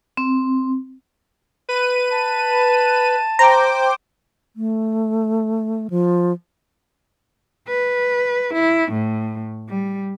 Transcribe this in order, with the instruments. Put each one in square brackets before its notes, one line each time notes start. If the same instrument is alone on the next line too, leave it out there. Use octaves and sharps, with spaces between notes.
[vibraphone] C4
[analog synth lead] B4 [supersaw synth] D#7
[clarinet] A5
[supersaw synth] C5 G5 D6 [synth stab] A#5
[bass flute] A3
F3
[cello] B4
E4
A2
G3